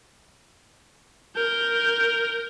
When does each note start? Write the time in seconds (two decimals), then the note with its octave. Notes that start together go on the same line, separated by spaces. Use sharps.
1.36 A#4 G6